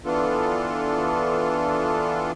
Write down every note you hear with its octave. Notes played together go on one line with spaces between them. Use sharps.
E3 B3 D4 F4 A4